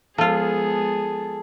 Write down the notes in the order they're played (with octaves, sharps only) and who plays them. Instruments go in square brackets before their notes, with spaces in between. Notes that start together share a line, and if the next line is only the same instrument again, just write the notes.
[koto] F3 F4 [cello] G#3 B3 [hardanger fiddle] G#4 [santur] A4